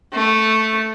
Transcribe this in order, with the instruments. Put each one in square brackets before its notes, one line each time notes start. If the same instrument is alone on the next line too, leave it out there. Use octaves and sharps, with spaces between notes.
[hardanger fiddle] A3